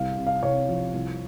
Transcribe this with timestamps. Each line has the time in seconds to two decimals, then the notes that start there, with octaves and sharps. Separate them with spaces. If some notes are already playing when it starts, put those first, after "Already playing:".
Already playing: C2 G3 F5
0.17 C3
0.27 F5
0.43 C2 C#5
0.69 F3
0.94 C2